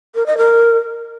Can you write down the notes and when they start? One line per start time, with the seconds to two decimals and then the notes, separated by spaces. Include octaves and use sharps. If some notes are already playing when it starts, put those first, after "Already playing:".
0.15 A#4
0.26 D#5
0.37 A#4